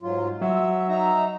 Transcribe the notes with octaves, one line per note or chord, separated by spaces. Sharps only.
G#2 F#3 F4
F#3 E5
D#4 E5 A#5